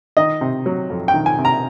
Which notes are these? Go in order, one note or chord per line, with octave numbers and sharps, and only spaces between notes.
D#3 D#5
C3
F#3
F2
G5
D#3
G#5
C3
A#5